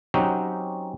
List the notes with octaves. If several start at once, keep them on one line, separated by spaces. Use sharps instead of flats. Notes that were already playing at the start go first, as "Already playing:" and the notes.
F#3 C4 C#4 D#4 F#4 G4